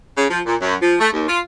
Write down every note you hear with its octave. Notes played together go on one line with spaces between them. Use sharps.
C#3
F3
A#2
F#2
F3
A3
D#2
F4